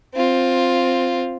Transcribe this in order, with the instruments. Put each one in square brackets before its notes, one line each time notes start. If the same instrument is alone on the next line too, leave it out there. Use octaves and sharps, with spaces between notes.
[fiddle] C4 F4